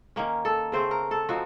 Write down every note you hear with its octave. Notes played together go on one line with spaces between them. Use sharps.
D#3 A#3 C#4
A4
C#3 A3 C4 C5
A#4
A4
F3 C4 D#4 F#4